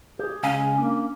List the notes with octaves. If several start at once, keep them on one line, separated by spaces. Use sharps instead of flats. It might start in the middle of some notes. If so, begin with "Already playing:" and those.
G4 G#4
C#2 C#4 F5 G#5
A#3 D4